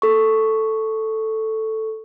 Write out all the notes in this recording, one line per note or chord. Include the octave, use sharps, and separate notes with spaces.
A4 C#6